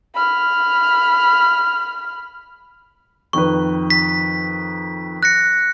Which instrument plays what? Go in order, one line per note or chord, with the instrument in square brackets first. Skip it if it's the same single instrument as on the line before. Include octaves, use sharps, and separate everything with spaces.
[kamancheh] B5 F6
[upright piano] F2 D#3 B4 [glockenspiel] C#6
[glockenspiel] B6
F#6 A#6 C#7